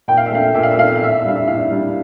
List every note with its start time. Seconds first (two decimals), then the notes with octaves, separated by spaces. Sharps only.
0.08 A#2 G5
0.17 F5
0.26 E5
0.31 A3 D4 F5
0.55 A#2 E5
0.63 F5
0.71 E5
0.77 A3 D4 F5
0.87 E5
0.95 F5
1.01 A2 E5
1.11 F5
1.20 E5
1.24 G3 D4 F5
1.36 E5
1.47 A2 F5
1.71 G3 D4